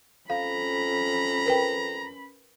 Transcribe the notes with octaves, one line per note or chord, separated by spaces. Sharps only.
F2 C#4 F5 A#5 B5
A#4 B4 G5